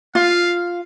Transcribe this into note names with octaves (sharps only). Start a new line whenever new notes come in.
F4 F5